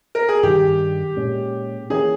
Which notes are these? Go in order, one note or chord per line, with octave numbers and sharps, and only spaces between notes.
A#4
G#4
G2 D#3 G3 G4
A#2 G#3 C#4
E3 A#3 C#4 G#4